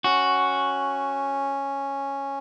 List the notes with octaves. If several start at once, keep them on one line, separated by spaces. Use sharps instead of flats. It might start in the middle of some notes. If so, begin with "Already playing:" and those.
C#4 F#4